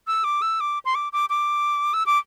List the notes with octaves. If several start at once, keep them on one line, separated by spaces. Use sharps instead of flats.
E6
D6
E6
D6
C6
D6
D6
D6
E6
D6